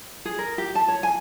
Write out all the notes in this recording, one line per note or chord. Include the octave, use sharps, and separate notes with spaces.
G#4
A#4
G4
A5
C#5
G#5